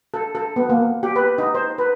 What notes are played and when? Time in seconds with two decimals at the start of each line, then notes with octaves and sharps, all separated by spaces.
0.14 A4
0.35 A4
0.56 B3
0.69 A#3
1.03 G4
1.16 B4
1.38 D#4
1.55 C5
1.78 B4